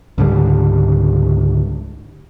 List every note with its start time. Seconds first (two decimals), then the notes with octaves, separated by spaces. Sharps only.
0.18 C#2 G#2 D3 G3